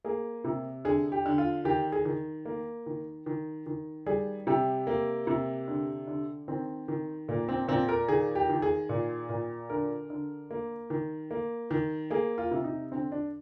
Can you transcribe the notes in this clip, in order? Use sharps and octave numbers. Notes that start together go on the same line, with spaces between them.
A#3 G#4
C3
D3 G#4
G4
D3
F4
D#3 G4
G#4
D#3
A#3
D#3
D#3
D#3
G3 G#4
C3 G4
A#3
C3
D3
D3
D#3 C4
D#3
A#2 A#3
C4
A#2 C4
A#4
D#3 G#4
G4
D#3
G#4
A#2
A#2
D3 A#4
D3
A#3
D#3
A#3
D#3
A#3 G#4
F4
C3
D#4
D3 C4
D4